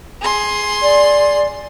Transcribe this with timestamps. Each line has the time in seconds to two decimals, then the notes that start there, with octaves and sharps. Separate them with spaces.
0.21 G#4 C6
0.82 D5